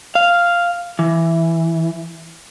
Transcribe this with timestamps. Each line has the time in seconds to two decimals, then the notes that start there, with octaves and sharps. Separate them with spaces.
0.15 F5
0.99 E3